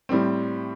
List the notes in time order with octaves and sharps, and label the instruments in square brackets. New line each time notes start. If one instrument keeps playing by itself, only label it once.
[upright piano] A2 G3 C4